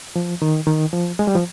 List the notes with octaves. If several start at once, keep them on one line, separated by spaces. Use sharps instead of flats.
F3
D#3
D#3
F3
G#3
G3
F3